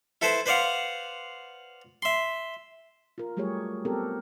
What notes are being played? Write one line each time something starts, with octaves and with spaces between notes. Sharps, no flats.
E4 A4 B4 C5 A5
B4 C5 D5 F5 F#5
E5 C6
F4 A#4
F#3 G3 A3 G4 G#4 C#5
B3 C4 G4 A4 A#4